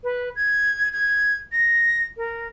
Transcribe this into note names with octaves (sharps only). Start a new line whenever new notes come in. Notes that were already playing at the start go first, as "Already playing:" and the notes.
B4
G#6
G#6
A#6
A#4